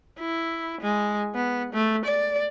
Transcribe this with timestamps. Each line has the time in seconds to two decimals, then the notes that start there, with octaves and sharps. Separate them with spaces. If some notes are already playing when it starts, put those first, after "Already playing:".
0.19 E4
0.81 G#3
1.35 B3
1.73 A3
2.05 D5